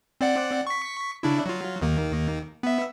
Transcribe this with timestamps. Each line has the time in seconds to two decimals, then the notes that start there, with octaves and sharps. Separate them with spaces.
0.21 C4 D5 F#5
0.67 C#6 B6
1.23 C#3 D4 E4
1.46 F#3 F4
1.82 D#2 D#3 A#3
2.63 B3 E5